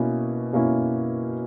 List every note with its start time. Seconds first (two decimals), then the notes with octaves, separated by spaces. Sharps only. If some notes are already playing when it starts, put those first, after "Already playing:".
Already playing: B2 A#3 C#4 E4
0.53 B2 A#3 C#4 E4